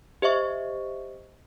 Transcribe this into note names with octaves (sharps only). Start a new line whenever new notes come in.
G4 C5 D#5 E5 C#6